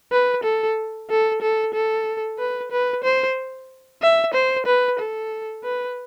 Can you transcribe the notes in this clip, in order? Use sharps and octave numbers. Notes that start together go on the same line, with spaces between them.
B4
A4
A4
A4
A4
B4
B4
C5
E5
C5
B4
A4
B4